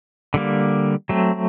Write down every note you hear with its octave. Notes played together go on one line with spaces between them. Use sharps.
D3 G3 A#3
F#3 A3 C4